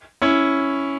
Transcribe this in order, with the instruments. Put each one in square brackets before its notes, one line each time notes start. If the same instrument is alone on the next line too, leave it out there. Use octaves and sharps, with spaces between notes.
[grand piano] C#4 E4